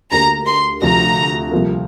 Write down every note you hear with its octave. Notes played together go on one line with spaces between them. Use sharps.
D2 D3 A#3 G4 A#4 A#5
C6
D2 C3 F3 A#5
C2 C3 F3 A#3